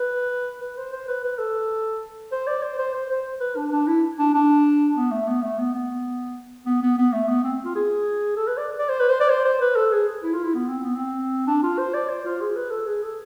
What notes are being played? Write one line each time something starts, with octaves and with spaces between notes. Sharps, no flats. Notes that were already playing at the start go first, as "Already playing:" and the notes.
Already playing: B4
B4
C5
C5
B4
B4
A4
C5
D5
C5
C5
C5
C5
B4
D4
D4
E4
D4
D4
B3
A3
B3
A3
B3
B3
B3
B3
B3
A3
B3
C4
F4
G#4
A4
B4
D5
D5
C5
B4
C5
D5
C5
C5
B4
A4
G#4
E4
F4
E4
B3
C4
B3
C4
D4
F4
C5
D5
C5
F4
G#4
B4
A4
G#4
A4